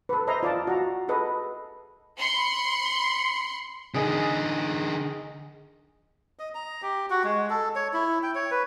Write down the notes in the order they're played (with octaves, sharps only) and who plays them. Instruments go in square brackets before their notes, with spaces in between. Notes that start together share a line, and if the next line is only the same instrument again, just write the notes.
[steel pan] A4 B4
C5 D#5 E5 A#5 C6
F4 D5 F5 A5
F#4 A#5
G#4 A4 B4 D#5
[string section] B5 C6 C#7
[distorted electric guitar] D3 D#4 [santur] G#4 D#5
[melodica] D#5
A#5
G4
F#4
G#3
A4
C#5
E4
G5
C#5
B4